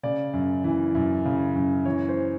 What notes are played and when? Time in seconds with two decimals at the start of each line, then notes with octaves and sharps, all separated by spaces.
0.03 C#3 D5
0.33 F#2
0.64 E3
0.95 F#2
1.25 C#3
1.55 F#2
1.85 E3 C#5
2.09 C5